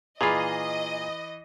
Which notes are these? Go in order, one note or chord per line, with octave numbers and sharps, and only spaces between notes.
A#2 E3 F4 G#4 D#5 B5